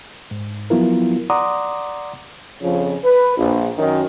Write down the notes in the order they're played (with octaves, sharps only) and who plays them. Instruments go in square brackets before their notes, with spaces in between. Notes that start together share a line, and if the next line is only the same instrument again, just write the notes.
[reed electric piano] G#2
F3 F#3 B3 E4 F4 A#4
D5 F#5 A#5 C6 D6 D#6
[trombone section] F2 C#3 F3
B4
A#1
F#2 D#3